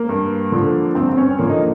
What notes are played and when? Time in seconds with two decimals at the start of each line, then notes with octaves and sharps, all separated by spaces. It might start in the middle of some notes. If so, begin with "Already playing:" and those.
Already playing: A#3
0.09 G2
0.52 D3 F3
0.95 G2 C4
1.09 C4
1.17 C#4
1.38 D3 F3 A#3
1.50 D#4